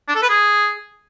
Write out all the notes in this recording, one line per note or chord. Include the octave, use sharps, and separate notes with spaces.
D4
A4
B4
G#4